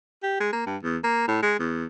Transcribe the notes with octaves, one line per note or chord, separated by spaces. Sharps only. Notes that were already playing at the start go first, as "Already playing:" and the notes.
G4
G#3
A#3
G2
E2
A#3
A2
G#3
E2